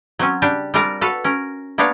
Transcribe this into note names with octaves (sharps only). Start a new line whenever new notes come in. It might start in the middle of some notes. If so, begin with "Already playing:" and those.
F#3 C4 C#4
C#3 G3 D4 G4
G3 C4 D4 F4 A#4 F5
F#4 A4 B4 F5
C#4 A#4
A#3 B3 D4 G4 C#5 F5